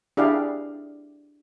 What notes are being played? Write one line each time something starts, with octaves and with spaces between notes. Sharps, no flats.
D4 E4 G4 G#4 D5 F5